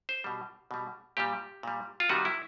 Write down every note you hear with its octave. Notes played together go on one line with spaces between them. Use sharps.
C5
B2 G3
B2 G3
A#2 G3 G4
A#2 G3
F4
C3 D#3 G3 F#4
E4